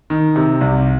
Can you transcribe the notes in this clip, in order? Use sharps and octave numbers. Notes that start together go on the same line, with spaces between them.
D#3
C3
C2